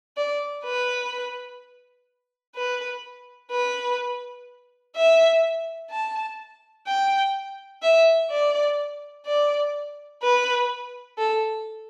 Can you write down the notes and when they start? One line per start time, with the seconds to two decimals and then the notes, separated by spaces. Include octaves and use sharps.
0.17 D5
0.65 B4
2.56 B4
3.51 B4
4.96 E5
5.91 A5
6.87 G5
7.82 E5
8.30 D5
9.26 D5
10.23 B4
11.18 A4